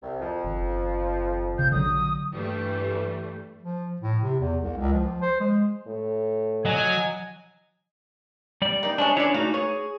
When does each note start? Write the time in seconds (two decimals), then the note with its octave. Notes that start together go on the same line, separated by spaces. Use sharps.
0.03 C2
0.20 F2 F3
0.44 F#1 D#3
1.59 A#1 C#3 G6
1.72 D3 F#3 D#6
2.33 G2 E3 G3 A3
3.63 F3
4.01 A2
4.22 C3
4.40 E2
4.61 C2
4.77 C#2
4.93 F3
5.22 C5
5.40 G#3
5.87 A2
6.65 F#3 D#5 G#5
8.62 G3 D5
8.83 A#3 D#4
8.98 C3 G#3 C#4 D4
9.17 D4 E4 G#4 C#5 D5
9.34 A3 D#4 F#4 F5
9.54 G#4 C#5